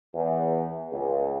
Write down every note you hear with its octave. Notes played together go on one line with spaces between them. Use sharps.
E2
C#2